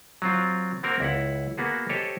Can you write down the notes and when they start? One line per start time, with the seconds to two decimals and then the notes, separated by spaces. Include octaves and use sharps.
0.22 F#3 C4 F4
0.83 A#3 C4 F#4 A#4
1.00 C#2 E4 F#5
1.58 A#3 B3 F#4 G#4
1.89 G4 A4 C5 C#5 D#5